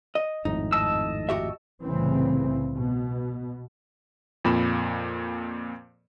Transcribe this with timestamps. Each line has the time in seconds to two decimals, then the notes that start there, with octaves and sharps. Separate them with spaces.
0.15 D#5
0.45 G#1 F2 A2 D#4
0.72 D#5 A5 E6
1.29 F#4 G4 E5
1.83 C2 A2 C#3 E3 C4
2.75 B2
4.44 F2 A#2 B5 E7